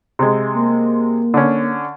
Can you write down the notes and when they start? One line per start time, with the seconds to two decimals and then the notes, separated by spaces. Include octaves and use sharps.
0.19 C3 G#3
0.56 A#3
1.34 D3 C#4